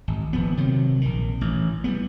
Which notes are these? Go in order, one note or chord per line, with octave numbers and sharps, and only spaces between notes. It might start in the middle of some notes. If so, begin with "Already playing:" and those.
G#1
D#1 F3 B3
C3 D#3 F#3
A#1 D#3
A1
G3 G#3 B3